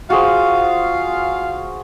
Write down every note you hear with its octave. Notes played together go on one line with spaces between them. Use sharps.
F4 F#4 G#4 C5 F5